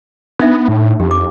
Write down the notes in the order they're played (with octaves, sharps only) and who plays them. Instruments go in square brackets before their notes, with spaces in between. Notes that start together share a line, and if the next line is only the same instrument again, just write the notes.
[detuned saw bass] B3 [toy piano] D4 D#4 E5
[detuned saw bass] A2
[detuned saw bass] F2 [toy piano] G4
[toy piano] D6